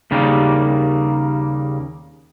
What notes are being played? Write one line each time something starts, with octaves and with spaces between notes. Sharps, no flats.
D#2 C#3 G3 A#3